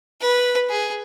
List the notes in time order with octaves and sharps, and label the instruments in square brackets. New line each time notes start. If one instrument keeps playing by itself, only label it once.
[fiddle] B4
G#4